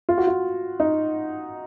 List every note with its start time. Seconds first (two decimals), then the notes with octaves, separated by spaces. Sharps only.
0.09 F4
0.18 F#4
0.27 F4
0.80 D#4